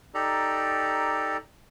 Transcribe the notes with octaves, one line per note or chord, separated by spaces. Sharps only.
D#4 G4 A4 D5 A#5